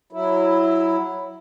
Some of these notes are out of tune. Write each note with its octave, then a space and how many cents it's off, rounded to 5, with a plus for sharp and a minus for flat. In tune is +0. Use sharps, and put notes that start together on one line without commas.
F#3 +0 E4 +0